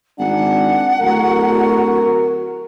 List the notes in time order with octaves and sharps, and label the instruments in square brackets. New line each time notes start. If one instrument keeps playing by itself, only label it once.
[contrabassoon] G#1 [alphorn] D4 [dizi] F#5
[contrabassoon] D1 [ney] F#4 [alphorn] A#4